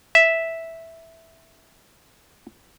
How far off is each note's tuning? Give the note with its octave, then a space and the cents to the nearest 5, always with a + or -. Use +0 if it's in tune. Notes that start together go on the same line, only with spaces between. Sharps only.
E5 -5